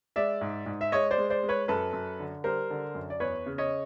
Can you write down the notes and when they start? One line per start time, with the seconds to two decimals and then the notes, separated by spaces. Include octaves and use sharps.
0.16 G#3 D5 E5
0.41 G#2
0.66 G#2
0.81 E5
0.92 G#3 C#5 D#5
1.11 C5 D5
1.18 G#3
1.30 C5 D5
1.43 G#3
1.49 B4 C#5
1.68 F#2 A4 B4
1.93 F#2
2.20 D3
2.44 G3 A#4 C5
2.71 D3
2.95 F#2
3.10 D5
3.20 E2 B4 C#5
3.46 C#3
3.58 C#5 D#5